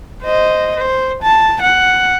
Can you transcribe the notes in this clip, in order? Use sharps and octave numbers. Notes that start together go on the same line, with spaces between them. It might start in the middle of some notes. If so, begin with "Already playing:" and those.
C5 D#5
C5
A5
F#5